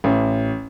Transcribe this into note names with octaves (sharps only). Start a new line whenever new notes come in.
A1